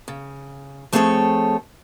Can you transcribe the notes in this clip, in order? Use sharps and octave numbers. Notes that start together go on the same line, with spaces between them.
C#3
F3 A3 C4 G#4 A4 C#5